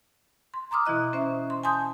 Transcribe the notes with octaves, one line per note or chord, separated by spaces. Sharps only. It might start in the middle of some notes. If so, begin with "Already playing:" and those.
C6
A#5 C6 D6 D#6 F6
B2 E3 E4 D#5 F#6
C#4 C5 E5
C6
G#5 A5 C6 D#6 G6